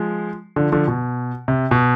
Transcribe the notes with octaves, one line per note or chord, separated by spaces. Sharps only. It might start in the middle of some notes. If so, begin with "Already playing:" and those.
Already playing: F3 G#3
D3 F3
D3 F3
B2
C3
B2